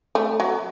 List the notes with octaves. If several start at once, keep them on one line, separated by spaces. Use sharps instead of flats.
A3
F#3